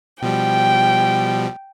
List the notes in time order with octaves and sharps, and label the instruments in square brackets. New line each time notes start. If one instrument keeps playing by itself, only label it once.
[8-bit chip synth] B2 F3 G3 [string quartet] G5